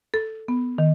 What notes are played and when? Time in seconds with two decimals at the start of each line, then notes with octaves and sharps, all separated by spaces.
0.14 A4
0.48 B3
0.78 D#3